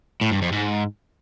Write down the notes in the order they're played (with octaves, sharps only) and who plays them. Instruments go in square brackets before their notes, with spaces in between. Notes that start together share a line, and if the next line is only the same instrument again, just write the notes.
[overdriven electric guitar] A2
G2
F2
G#2